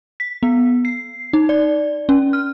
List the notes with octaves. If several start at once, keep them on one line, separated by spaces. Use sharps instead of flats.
B6
B3
C7
D#4
D5
C#4
F6